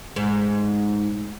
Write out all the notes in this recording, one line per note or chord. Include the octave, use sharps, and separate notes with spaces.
G#2